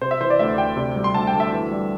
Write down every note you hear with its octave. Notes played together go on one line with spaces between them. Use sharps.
C3 C5
E5
E3 C5
D5
D2 E5
D2 G5
C3
G3
C6
D2 A5
G5
D2
E5
E3
G3